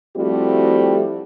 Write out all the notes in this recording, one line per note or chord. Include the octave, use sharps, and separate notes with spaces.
F3 G3 A3 C4 E4 F#4